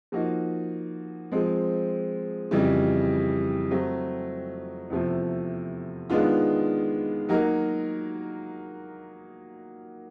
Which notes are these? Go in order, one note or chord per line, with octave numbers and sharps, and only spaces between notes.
F3 A#3 D#4 F#4
F3 G#3 C4
F2 C#3 E3 G3
F#3 A3 C4
E2 C3 F3 A3
D#3 G#3 B3 D4 F4
F#3 A#3 D#4 F#4 A#4